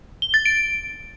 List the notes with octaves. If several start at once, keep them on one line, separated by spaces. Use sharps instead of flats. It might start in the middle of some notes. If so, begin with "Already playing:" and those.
G7
A6
D7